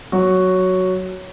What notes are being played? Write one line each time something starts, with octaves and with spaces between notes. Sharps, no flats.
F#3 F#4